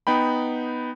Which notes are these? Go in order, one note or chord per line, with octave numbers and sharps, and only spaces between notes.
B3 D#4 G5 B5